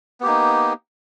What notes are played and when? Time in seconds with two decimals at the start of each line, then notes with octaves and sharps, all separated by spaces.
0.20 B3
0.23 G4
0.26 A#3
0.28 D#4